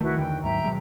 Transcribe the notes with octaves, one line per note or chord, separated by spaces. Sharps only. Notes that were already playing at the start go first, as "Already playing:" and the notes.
C2 D#3 A3 E4 F#4 B4
E2 D3 E3 G5
D#2 G#2 F#3 E5 G5 A#5
B2 F#3 G#3